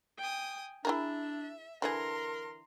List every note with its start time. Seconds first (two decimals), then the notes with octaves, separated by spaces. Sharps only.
0.18 G5 G#5 D#6
0.85 D4 E4 G#4 A#4 E5
1.82 D3 E3 G#4 A#4 A#5 C6